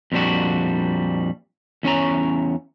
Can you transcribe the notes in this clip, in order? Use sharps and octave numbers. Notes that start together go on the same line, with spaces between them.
F2 A#2 G3 D4 F#4
E2 C#4 C#5 A#5